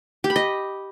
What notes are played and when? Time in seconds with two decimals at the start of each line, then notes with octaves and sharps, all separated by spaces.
0.24 G4
0.30 B5
0.36 D#5